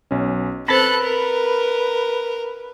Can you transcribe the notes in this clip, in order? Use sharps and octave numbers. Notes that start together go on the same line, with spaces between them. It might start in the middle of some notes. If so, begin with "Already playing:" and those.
B1 C#4
C4 A4 B4 C5 B5 F#6 A6 B6
A#4